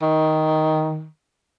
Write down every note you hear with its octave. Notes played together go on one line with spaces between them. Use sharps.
D#3